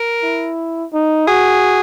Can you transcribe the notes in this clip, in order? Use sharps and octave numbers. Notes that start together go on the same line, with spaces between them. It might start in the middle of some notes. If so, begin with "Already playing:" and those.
Already playing: A#4
E4
D#4
F#4 G#4